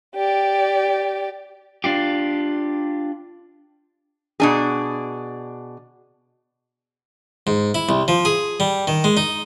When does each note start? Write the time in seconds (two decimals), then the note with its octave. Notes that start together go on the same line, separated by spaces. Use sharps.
0.15 G4 D5
1.84 D4 F4 G4
4.40 B2 D4 G#4
7.47 G#2
7.75 E4
7.89 C2
8.08 F3
8.25 G#4
8.60 G3
8.87 D#3
9.04 G#3
9.17 D#4